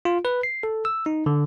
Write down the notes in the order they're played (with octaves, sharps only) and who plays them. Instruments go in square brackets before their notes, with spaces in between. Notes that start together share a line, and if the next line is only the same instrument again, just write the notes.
[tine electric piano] F4
B4
C7
A4
E6
D#4
D3